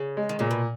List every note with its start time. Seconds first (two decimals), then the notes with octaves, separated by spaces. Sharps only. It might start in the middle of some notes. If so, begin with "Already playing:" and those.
Already playing: C#3
0.17 G#3
0.29 D#3
0.39 A#2 C#3
0.51 B2